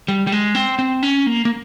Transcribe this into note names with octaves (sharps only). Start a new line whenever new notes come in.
G3
G3
G#3
C4
C4
C#4
A#3
A#3